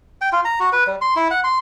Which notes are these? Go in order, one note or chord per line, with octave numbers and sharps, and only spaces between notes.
G5
F4
A#5
F#4
B4
G3
C6
E4
F#5
C6